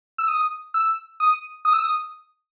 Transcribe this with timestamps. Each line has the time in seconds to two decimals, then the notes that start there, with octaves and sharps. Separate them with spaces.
0.18 E6
0.28 D#6
0.74 E6
1.20 D#6
1.65 D#6
1.73 E6
1.82 D#6